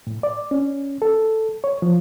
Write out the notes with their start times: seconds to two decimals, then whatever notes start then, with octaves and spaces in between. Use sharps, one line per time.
0.07 A2
0.23 D5
0.51 C#4
1.02 A4
1.64 C#5
1.82 F3